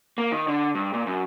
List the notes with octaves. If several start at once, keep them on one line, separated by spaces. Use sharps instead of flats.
A#3
D#3
D3
G2
A#2
F#2